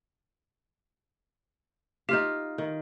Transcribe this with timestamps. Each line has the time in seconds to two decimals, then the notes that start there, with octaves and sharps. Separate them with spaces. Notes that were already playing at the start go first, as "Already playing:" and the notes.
2.09 D#4 F4 G4 F5 F6 B6
2.58 D#3